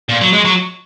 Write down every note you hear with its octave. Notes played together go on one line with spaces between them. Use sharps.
A#2
F#3
G#3
F#3